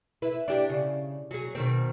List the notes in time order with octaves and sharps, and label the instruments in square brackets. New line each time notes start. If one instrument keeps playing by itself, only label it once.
[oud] E4 B4
D4 G4
C#3
F#3 G#4
B2 D#3 C4